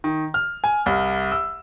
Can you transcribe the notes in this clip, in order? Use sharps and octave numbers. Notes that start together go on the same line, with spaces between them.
D#3
F6
G#5
C2
E6